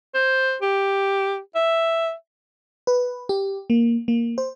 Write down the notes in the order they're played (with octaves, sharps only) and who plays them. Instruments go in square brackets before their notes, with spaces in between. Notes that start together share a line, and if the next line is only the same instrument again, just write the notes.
[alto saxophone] C5
G4
E5
[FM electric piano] B4
G4
A#3
A#3
C5